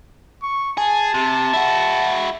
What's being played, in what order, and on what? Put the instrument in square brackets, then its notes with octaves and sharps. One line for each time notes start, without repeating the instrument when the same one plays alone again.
[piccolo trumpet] C#6
[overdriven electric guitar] G#4 [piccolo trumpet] A5
[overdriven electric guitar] C3
E4 F#4